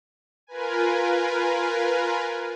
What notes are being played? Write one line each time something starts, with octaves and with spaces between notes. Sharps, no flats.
F4 A#4 B4 G#5